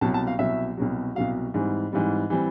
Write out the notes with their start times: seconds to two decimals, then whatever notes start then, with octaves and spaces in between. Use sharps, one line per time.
0.01 C2 B2 F#3 A5
0.14 A5
0.27 F5
0.39 C2 B2 F#3 E5
0.77 C2 B2 F#3
1.15 C2 B2 F#3 F5
1.54 G#2 E3 G3 C4
1.92 G#2 E3 G3 C4
2.30 E3 G3 C4